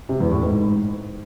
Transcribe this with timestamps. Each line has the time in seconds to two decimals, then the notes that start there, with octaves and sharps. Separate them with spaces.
0.09 C3
0.20 E2
0.32 A2
0.43 G#2